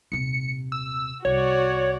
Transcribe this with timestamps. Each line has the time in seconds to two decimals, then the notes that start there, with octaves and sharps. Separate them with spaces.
0.12 D#1 C3 C#7
0.72 E6
1.25 C2 F#4 C#5 D5